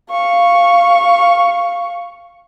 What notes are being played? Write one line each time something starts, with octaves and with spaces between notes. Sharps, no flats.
F5 C#6